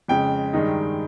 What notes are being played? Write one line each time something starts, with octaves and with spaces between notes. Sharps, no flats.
F2 C#3 G#3 G5
G2 D#3 G#3 D#4